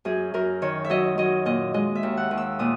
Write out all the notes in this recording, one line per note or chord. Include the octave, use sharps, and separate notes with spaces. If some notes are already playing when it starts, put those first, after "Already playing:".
F#2 G#4
F#2 A#4
D#3 C#5
E5
F#3 D#5
F#3 D#5
A#2 D#5
G#3 D#5
E5
D#2
F#5
D#2
E6
A#2 D#6